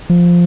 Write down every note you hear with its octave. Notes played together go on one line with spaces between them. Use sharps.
F3